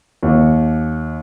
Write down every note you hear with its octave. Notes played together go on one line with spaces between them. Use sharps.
D#2